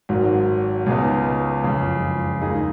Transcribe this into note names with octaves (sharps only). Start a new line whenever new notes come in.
G#1 G#2 F#3
C#2 C#3 G#3 B3 D#4
F#1 F2 C#3 G#3
D#2 D#3 G#3 D#4 G#4